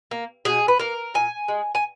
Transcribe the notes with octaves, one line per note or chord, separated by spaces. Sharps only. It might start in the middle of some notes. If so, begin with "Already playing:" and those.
A#3
B2 G#4
B4
A#3 A#4
A#2 G#5
G#3
G#5